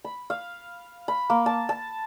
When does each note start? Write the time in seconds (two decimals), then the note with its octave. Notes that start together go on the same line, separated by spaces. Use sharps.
0.04 B5
0.30 F5
1.08 B5
1.30 A#3
1.46 A5
1.69 A5